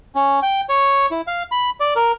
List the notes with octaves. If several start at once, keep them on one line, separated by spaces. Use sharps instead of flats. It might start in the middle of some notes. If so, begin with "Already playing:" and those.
C#4
G5
C#5
E4
F5
B5
D5
A#4